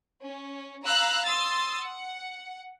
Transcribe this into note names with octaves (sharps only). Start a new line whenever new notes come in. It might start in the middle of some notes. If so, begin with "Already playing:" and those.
C#4
F5 A#5 B5 E6 F#6
C6 D#6 E6 A6
F#5